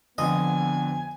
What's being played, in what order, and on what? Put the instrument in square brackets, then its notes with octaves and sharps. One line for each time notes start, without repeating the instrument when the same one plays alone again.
[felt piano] F2 D3 F3 [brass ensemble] B3 [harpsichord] D#5 [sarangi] G#5